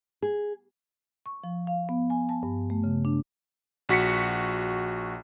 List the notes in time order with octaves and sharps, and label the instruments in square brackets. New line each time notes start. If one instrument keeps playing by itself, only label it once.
[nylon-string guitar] G#4
[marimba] C#6
F3
F5
B3
G#5
A5
G2
A3
C#3
D4
[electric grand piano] A#1 F#4 B6 C#7